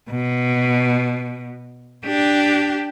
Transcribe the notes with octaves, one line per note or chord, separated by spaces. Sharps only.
B2
D4 G4